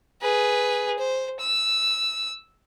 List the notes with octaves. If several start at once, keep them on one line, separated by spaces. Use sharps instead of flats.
G#4 B4
C5
E6